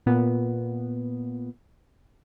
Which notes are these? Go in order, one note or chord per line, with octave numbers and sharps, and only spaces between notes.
A#2 B3